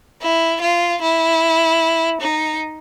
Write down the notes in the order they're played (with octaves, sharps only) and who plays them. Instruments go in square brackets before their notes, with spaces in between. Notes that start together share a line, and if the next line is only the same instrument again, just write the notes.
[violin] E4
F4
E4
D#4